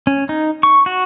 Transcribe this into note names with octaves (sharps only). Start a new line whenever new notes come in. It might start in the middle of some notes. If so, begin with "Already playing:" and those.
C#4
D#4
C#6
F#4